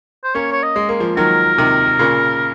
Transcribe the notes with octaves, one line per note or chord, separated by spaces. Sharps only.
C5
A#3 C#4 C#5
C#5
D#5
G#3
A#3
F3 G#3
D#3 F#3 A#4
C3 D#3
A#2 C#3